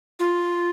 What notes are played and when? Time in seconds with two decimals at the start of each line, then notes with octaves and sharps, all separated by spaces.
0.19 F4